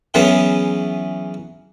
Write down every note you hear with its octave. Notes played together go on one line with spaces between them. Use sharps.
E3 F#3 B3 C#4 G#4 B4